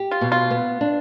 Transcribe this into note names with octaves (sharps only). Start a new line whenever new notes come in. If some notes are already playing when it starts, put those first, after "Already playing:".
Already playing: G4
F4
B2
F4
B3
D4